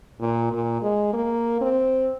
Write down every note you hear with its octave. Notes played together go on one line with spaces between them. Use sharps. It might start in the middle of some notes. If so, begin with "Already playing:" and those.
A#2
A#2
G#3
A#3
C4